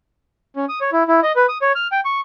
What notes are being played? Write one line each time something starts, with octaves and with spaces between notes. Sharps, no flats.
C#4
D#6
C#5
E4
E4
D#5
B4
D#6
C#5
F6
G5
C#6